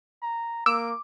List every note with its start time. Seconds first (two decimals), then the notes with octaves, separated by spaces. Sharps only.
0.23 A#5
0.66 A#3 D6 E6